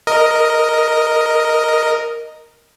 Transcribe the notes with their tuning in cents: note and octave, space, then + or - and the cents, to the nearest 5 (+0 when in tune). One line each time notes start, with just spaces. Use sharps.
A#4 +0 D#5 +0